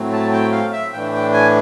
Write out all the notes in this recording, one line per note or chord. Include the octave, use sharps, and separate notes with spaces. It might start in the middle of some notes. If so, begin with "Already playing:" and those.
Already playing: A2 F#3 A3 C4
A5
G5
F5
E5
A2 E3 A3 D4 G5
G5
G#5